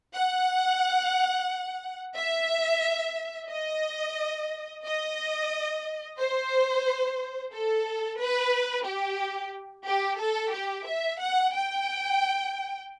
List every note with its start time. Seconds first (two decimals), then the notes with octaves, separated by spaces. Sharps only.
0.15 F#5
2.16 E5
3.50 D#5
4.84 D#5
6.18 C5
7.53 A4
8.19 B4
8.86 G4
9.86 G4
10.20 A4
10.53 G4
10.87 E5
11.21 F#5
11.55 G5